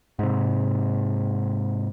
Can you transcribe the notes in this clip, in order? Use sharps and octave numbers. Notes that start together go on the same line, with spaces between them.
G#2 C3